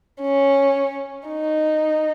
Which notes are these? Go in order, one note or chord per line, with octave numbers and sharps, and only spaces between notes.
C#4
D#4